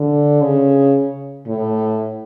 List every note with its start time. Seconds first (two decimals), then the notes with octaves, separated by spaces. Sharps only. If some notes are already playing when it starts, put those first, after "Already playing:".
Already playing: D3
0.41 C#3
1.47 A2